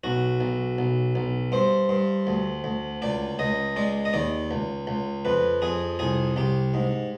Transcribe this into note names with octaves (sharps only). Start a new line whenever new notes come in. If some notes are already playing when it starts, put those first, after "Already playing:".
B1 F#4
B1
B1
B1
G2 C5
G2
D2
D2
C#2 D5
C#2 D#5
G#3 D5
D#5
D#2 D5
C#2
C#2
F2 B4
F2 G#4
C2 G#4
C2 G4
G#2